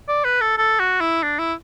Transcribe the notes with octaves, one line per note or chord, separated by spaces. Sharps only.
D5
B4
A4
A4
F#4
E4
D4
E4